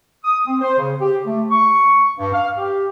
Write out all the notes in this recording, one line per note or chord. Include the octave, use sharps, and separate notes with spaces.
D#6
C4
C5
C#3
G4
A3
C#6
G2
F5
G4